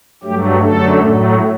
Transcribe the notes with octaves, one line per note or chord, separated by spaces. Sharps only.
G2 F#3 A3 G4
F#2 D3 F#3 A3 A4
A2 F#3 A3